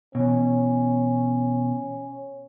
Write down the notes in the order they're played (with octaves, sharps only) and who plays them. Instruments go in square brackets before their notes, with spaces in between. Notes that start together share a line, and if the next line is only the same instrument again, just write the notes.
[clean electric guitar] B2 E3 [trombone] C#4